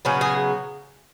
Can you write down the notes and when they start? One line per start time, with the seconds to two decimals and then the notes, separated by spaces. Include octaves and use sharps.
0.05 C#3 F#3 B3
0.21 G#4